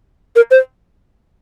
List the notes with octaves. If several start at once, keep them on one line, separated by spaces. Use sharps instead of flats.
A#4
C5